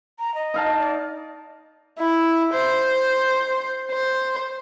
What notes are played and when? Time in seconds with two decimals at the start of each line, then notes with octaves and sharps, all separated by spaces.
0.19 A#5
0.35 D#5
0.54 D#4 F5 A5
0.79 D5
1.99 E4
2.53 C5
3.92 C5